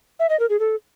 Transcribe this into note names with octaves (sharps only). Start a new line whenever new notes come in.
E5
D#5
A#4
G#4
A4